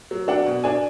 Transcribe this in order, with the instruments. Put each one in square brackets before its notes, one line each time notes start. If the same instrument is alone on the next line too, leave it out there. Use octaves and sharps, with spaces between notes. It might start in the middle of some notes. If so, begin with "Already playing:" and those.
[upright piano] F#3
D4 F#5
B2
D4 G#5